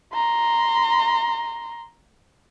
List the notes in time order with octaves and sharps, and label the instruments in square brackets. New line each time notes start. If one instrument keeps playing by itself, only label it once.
[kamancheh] A#5 C6